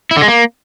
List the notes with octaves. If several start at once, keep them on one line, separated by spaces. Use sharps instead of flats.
E4
D3
G#3
A#3